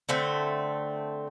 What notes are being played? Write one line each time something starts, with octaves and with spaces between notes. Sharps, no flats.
D3 A3 C4